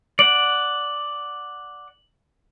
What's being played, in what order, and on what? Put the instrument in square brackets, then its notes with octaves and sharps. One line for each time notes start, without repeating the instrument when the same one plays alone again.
[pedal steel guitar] D5 F#5 [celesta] F#7